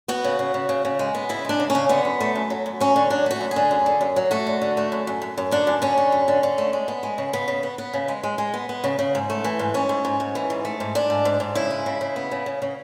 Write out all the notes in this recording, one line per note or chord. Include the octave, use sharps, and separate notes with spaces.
B3 F#4
C#3
C#3
C#3
C#3
C#3
G#3
B3
C#3 E4
G#3 D4
C#3
C#4
C#3
D3 B3
F#2
A3
F#2
F#3
F#2
F#3 C#4
D3
F#3 D4
A3 F#4
F#2
G#4
D3
F#2
D3
F#2
F#3
A3 F#4
D3
D3
A3
F#2
F#2
F#2
F#2
D3 D4
F#2
D3 C#4
D3
F#2
D3
D3
A3
G#3
B3
G#3
C#3
C#3 B3
C#3
B3
B3
C#3
G#3
G#3
G#3
B3
B3
C#3
C#3
G#2
A3
E3
G#2
G#2 C#4
G#2
G#2
G#2
E3
G#2
A3
G#2
G#2 D4
G#2
G#2
G#2
C#3 E4
G#3
C#3
C#3
B3
C#3
C#3
C#3